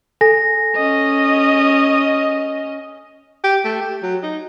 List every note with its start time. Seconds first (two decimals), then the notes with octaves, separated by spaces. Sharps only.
0.21 A4 G#5 A#6
0.76 C#4 D#5
3.44 G4
3.64 A3
3.81 G4
4.03 F#3
4.23 D#4